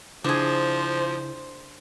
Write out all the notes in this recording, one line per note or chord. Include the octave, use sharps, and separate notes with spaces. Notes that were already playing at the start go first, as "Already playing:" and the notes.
C#3 F3 D4 E4 G#4 C5